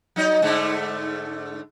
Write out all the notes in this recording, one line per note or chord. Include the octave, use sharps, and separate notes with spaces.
F#3 D#4 D#5
G#2 D3 A3